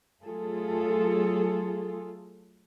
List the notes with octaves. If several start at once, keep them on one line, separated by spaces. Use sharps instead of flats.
F#3 A3 F4 G#4 A4